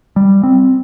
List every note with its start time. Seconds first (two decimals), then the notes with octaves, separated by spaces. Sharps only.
0.16 G3
0.43 C4